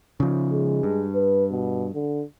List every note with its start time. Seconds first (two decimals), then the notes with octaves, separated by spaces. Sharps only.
0.20 C#3 F3
0.52 G#3
0.83 G2
1.15 B4
1.51 B2
1.93 D3